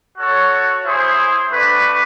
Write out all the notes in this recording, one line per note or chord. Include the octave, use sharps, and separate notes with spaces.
F#4 A4 C#5
E4 G#4 C5
A3 D4 F#4 B4 D5